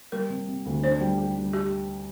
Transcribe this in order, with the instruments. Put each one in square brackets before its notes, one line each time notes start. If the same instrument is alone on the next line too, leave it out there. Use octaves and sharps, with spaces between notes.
[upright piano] G3 [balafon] A#4
[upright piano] C3
C3
D2
[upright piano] D4 [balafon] C5
[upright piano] G3
G4
G3
[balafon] G4